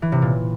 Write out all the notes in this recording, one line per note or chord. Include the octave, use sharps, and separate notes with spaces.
E3
C3
A#2